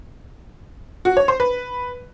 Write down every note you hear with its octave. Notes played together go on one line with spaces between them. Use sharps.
F#4
C#5
C5
B4